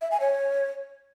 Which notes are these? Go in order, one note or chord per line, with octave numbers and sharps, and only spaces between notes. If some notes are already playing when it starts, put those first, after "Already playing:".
E5
G#5
C#5